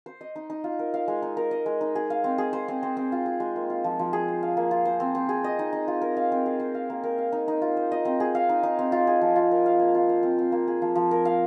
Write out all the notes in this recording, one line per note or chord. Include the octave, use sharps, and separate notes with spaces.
C5
D#5
D#4
D#4
F4
A#4
F5
G#3
D#4
A#4
D#5
G#3
D#4
G#4
F5
C4
G#4
C5
C4
C4
C4
F4
G#4
G#3
A#3
F4
F3
F3
G#4
C5
F5
A#3
F4
C5
C4
C4
G#4
D#5
D#4
D#4
F4
A#4
F5
C4
G#4
C5
F5
A#3
A#4
F5
D#4
D#4
F4
C5
D#5
C4
G#4
F5
D#4
D#4
C4
F4
G#4
F3
F4
A#4
F5
A#3
F4
C5
C4
C4
A#3
G#4
F3
F3
A#4
F5